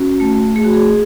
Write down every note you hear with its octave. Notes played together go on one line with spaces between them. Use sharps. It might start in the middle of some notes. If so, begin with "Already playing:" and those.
Already playing: C#4 F#4
A3
A3 G#4
F#4
G#4